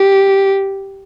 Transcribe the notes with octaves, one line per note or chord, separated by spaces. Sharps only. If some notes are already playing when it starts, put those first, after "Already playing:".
Already playing: G4